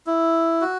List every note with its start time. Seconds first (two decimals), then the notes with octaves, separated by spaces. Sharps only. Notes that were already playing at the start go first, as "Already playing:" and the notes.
0.07 E4
0.61 F#4